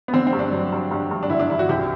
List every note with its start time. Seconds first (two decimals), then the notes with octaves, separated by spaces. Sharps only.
0.08 B3
0.13 D3 C4
0.27 C4
0.33 G2
0.39 D4
0.52 F#3
0.72 G2
0.91 G2
1.11 G2
1.23 D4
1.30 D3 E4
1.40 D4
1.50 G2 E4
1.59 F#4
1.69 C2 G4